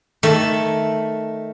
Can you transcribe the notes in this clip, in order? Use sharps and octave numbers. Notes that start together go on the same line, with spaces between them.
D#3 A3 E5